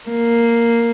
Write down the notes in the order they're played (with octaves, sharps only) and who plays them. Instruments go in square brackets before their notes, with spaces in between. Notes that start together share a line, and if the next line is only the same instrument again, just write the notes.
[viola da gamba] A#3